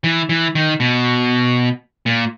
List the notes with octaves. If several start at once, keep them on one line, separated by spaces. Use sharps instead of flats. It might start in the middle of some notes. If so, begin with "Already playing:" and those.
E3
E3
D#3
B2
A#2